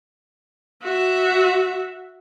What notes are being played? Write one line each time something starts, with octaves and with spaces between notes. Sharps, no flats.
F#4 E5